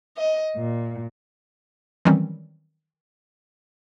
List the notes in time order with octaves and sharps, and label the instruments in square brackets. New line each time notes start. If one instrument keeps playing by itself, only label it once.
[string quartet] D#5
A#2
[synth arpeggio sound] D#3 E3 F#3 G3 C4 C#4